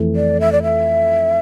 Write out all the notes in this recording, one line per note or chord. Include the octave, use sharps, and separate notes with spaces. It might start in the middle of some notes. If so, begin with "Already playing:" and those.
Already playing: F2 E3 A3 E4
D5
E5
D5
E5